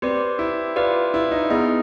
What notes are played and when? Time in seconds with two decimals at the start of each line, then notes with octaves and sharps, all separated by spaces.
0.02 C4 G4 B4 D5
0.39 E4
0.76 F4 G4 B4 D5
1.14 E4
1.32 D#4
1.50 B3 D#4 E4 G#4